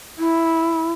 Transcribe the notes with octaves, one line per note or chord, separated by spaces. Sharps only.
E4